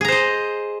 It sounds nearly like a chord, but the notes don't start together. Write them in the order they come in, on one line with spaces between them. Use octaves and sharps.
G#4 A#5 C5 D#5